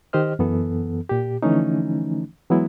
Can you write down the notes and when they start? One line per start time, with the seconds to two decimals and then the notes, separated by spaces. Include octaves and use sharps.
0.13 D#3 G4 C5 D#5 F6
0.39 F#2 E3 B3 A4
1.09 A#2 G4
1.42 D3 E3 F3 A3 C#4 D#4
2.50 E3 F#3 G#3 B3 E4